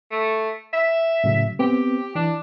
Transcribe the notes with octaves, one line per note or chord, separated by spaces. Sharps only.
A3
E5
A2 C#3 F#3
B3 C4 G4
E3 D4